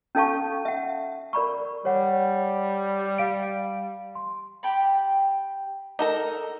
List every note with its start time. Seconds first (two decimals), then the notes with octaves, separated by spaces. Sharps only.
0.15 C#4 D#4 A4 F5 A5 C#6
0.65 E5 F#5
1.33 A#4 D5 B5 C#6
1.85 G3 C#5 F#5
3.18 F5 D7
4.15 C6
4.63 G4 G5 A5 B5
5.99 D#4 A4 A#4